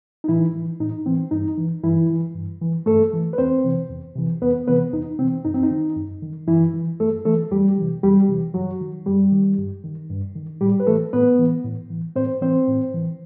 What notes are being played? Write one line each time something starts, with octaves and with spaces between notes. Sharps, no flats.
D#4
A2 E3 E4
E3
A2 D#4
E3 C4
G2 D#4
E3
G2 E3 E4
E3
G2
E3
G2 A3 A4
E3
B4
E2 C4 C5
C3 E3
E2
C3 E3
E2 B3 B4
C3 E3 B3 B4
E2 D#4
C3 E3 C4
F#2 D#4
C4
D#4
D#3
F#2
D#3
F#2 E3 E4
E3
F#2 A3 A4
E3 A3 A4
E2 G3 G4
C3 E3
E2 G3 G4
C3 E3
F#2 F#3 F#4
D#3
F#2 G3 G4
D#3
G2
D#3
G2
D#3
A2 G3 G4
B4
E3 A3 A4
A2 B3 B4
E3
A2
E3
A2 C4 C5
E3 C4 C5
A2
E3